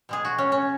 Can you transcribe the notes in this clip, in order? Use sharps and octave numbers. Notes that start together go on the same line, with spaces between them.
B2 G#3 G#4
F#4
C#4
C#4